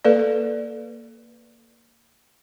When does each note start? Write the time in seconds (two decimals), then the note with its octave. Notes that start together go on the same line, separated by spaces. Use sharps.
0.05 A#3 A4 B4 D5